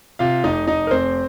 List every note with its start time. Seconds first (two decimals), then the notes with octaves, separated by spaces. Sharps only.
0.19 C3 F4 F5
0.44 F1 D#4 D#5
0.67 F1 D#4 D#5
0.87 A#4
0.91 F1 C4 C5